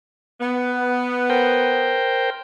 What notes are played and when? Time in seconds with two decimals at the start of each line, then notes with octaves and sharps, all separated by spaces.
0.40 B3
1.30 A#4 C5 G5